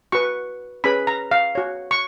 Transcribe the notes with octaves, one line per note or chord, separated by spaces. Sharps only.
F#4 B4 C#6
C#4 G#4 B4 B5
A#5
F5
F#4 C#5
C#6